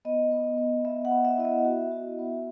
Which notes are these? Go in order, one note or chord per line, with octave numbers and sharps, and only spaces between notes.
B3 D#5
B3
B3
B3 E5
F#5
B3
E5
E4 D#5
E5
F#4
F#4
B3